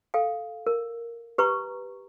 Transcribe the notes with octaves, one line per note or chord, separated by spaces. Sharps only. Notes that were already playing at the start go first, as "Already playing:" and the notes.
A4 F5 G5
A#4
G4 B4 A#5 C#6